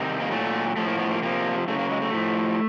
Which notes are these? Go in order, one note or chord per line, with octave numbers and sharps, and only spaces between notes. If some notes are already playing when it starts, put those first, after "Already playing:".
Already playing: C3 D#3 G3
A#3
A#2 F#3 A3
A2 F3 A3
A#3
B3
A#3
C3 F3 A#3
C#3 F#3 A3
A#3
G#3
A3
A2 F3